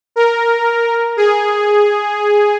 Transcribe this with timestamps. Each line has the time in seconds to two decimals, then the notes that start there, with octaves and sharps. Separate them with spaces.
0.16 A#4
1.17 G#4